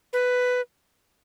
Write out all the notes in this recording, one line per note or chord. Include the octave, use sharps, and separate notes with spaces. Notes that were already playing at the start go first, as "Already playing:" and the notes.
B4